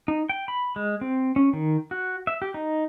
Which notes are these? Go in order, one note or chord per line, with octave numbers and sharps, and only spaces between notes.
D#4
G5
B5
G#3
C4
C#4
D#3
F#4
E5
G4
D#4